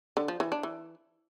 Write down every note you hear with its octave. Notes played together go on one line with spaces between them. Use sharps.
D3
F3
E3
D4
E3